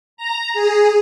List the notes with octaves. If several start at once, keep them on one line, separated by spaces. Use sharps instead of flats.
A#5
G#4